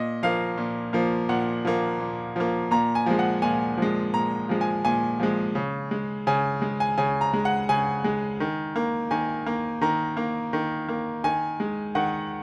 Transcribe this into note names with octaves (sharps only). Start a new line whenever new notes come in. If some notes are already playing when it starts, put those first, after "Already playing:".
Already playing: A#2 D#5
F3 A#3 F5
A#2
F3 A#3
A#2 F#5
F3 A#3
A#2
F3 A#3
A#2 A#5
G#5
F3 G#3
F#5
A#2 G#5
F3 G#3
A#2 A#5
F3 G#3
G#5
A#2 G#5
F3 G#3
C#3
G#3
C#3 G#5
G#3
G#5
C#3 G#5
A#5
G#3
F#5
C#3 G#5
G#3
D#3
A#3
D#3 G#5
A#3
D#3 A#5
A#3
D#3
A#3
D#3 G#5
G#3
D#3 F#5